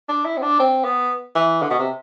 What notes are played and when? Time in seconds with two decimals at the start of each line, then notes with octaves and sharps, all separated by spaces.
0.09 D4
0.25 E4
0.37 C4
0.42 D4
0.59 C4
0.84 B3
1.35 E3
1.62 D3
1.70 B2
1.79 C3